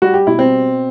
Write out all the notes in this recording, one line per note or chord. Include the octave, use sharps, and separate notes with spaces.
G3 F#4
G4
B2 E4
C4